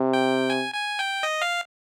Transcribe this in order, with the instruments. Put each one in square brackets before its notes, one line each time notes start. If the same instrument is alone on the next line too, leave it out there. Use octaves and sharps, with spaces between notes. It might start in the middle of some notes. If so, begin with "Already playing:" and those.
Already playing: [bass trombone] C3
[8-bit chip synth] G5
G#5
G#5
G5
D#5
F5